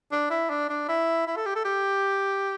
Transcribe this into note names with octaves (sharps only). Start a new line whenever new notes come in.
D4
E4
D4
D4
E4
E4
A4
G4
A4
G4